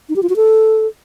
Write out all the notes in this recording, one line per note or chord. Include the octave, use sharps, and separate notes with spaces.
D#4
G4
F4
F#4
A4